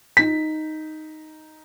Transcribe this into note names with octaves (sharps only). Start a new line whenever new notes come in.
D#4 B6